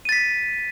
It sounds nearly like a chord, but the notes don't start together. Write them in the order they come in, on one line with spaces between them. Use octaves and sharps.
D#7 A6 B6